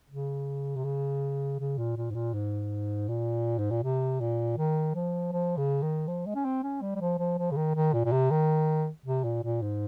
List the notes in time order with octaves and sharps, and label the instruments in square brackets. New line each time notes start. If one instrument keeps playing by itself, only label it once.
[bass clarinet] C#3
C3
C#3
C#3
A#2
A#2
G#2
A#2
G#2
A#2
G#2
A#2
C3
A#2
D#3
F3
F3
C#3
D#3
F3
G#3
C#4
C4
C#4
G3
G3
F3
F3
F3
C#3
D#3
D#3
A#2
A#2
C3
D#3
C3
A#2
A#2
G#2